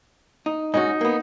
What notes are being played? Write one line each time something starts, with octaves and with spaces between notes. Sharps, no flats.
D#4
G#2 C#4 D#4 F#4
A#3 B3